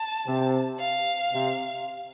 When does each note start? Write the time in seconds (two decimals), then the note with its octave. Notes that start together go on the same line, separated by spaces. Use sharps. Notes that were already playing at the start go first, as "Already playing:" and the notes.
Already playing: A5
0.26 C3
0.79 F5
1.33 C3